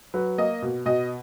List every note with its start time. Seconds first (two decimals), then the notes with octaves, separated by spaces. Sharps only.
0.14 F#3 B4
0.38 A#3 D#5
0.62 B2
0.85 B2 D#5